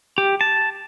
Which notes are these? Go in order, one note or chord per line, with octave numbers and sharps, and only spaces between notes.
G4
A5